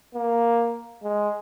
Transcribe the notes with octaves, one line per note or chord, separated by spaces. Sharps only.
A#3
G#3